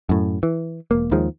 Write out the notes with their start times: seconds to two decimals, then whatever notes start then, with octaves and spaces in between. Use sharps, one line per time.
0.09 F#2 A2
0.43 E3
0.91 E1 A#3
1.11 D#2 D#3 F3 G#3